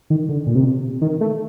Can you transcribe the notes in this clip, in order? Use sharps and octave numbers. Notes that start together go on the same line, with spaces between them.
D#3
D3
A#2
C3
D#3
A3